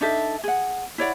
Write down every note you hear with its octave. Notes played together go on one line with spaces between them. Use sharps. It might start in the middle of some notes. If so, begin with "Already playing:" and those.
D4 D#4 A4 E5
G#4 F#5
E4 C#5 D5 F#5